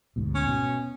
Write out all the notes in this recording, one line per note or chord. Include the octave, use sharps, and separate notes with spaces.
D2 G#2 B2
C#4
B2